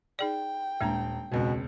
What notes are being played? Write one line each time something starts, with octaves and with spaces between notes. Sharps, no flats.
D#4 G#4 D5 G5
D#1 G#3 A#3 D4 A#5
E1 C#2 B2 C4